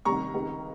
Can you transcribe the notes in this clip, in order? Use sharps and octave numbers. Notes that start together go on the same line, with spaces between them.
C2 C3 D#3 A#5 C#6
C#2 C3 D#3